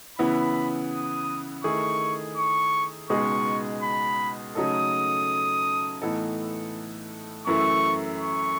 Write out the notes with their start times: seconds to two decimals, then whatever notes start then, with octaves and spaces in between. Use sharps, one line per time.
0.18 C#3 E3 B3 E4 B5
0.92 D#6
1.64 D#3 A3 E4 G#4 C#6
2.37 C#6
3.10 C#2 B2 G#3 D#4 G#4 C#6
3.83 B5
4.55 C#3 F#3 A3 D#4 A4 D#6
6.01 A2 E3 B3 D#4 A4
7.47 F#2 E3 A3 E4 C#6
8.20 C#6